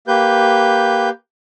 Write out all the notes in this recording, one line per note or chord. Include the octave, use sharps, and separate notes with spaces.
A#3 G4 B4 G6